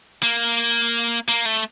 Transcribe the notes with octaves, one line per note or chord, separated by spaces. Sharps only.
A#3
A#3
A3